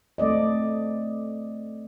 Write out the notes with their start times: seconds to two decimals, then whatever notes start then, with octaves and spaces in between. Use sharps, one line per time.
0.18 A3 C4 D5 D#5